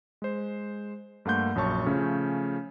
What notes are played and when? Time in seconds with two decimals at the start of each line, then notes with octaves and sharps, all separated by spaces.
0.22 G#3 C5
1.25 G2 A3 A#3 F#5 C6 G6
1.55 A#1 F#2 C#5 A5 C#6
1.86 C#3 F3 A3 C#4